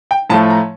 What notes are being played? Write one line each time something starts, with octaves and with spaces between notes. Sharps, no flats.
G5
A2 F3 A3 A5
A#5